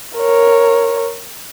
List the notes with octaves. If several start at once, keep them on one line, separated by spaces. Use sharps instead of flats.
A#4 C#5